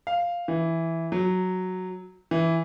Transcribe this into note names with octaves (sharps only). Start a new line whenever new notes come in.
F5
E3
F#3
E3